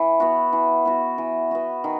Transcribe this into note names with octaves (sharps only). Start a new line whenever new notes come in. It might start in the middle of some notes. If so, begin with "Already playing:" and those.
Already playing: E3
B3 F#4
E3
B3 F#4
E3
B3 F#4
D#3